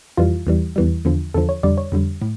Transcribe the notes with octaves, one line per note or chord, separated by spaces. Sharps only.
F2 E3 G3 F4
E2 E3 G3
E2 E3 G3
E2 D3 F3
E2 D3 F3 A4
C#5
F2 D3 G3 D5
C#5
F2 D3 G3
A2